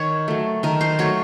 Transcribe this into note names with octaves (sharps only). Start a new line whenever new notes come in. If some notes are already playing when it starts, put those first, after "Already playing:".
Already playing: D#3 C#5
F#3 A3
D#3 A#4
C5
F#3 A3 C#5